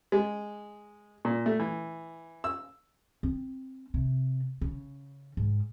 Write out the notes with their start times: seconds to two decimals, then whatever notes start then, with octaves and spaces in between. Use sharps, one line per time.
0.12 G#3
1.25 A#2
1.46 A3
1.59 E3
2.44 E6
3.23 C4
3.94 C3
4.61 C#3
5.37 G#2